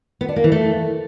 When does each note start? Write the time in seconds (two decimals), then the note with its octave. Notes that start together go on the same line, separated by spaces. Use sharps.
0.21 B3
0.28 D4
0.36 A#3
0.44 E3
0.52 A3